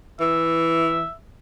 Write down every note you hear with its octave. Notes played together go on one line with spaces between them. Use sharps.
E3 E5